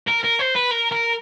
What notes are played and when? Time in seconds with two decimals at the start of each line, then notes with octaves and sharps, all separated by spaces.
0.08 A#4
0.24 A#4
0.40 C5
0.56 B4
0.71 A#4
0.92 A#4